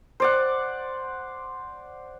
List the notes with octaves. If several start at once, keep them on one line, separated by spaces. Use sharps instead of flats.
C5 D5 F#5